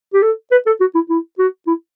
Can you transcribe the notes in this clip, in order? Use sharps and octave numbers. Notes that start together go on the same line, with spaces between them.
G4
A4
B4
A4
F#4
E4
E4
F#4
E4